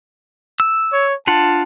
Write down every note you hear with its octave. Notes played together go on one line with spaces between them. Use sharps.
E6
C#5
D4 F4 F#5 A5